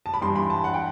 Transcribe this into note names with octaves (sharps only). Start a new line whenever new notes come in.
A5
B5
G2 E3 G3 C6
B5
A5
F#5
G5